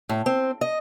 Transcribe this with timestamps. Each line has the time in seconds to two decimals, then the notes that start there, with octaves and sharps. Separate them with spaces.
0.09 A2
0.26 C4
0.61 D#5